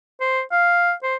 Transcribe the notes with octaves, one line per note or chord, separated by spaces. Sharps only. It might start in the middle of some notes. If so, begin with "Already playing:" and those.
C5
F5
C5